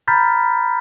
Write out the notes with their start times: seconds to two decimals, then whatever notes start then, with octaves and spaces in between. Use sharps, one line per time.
0.08 A#5 B5 F6 G6 A6 B6